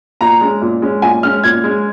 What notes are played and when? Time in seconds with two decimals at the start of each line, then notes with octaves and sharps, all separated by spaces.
0.21 A#2 A#5
0.41 G#3 C#4
0.62 A#2
0.82 G#3 C#4
1.02 A#2 G#5
1.23 G#3 C#4 F6
1.44 A#2 G#6
1.64 G#3 C#4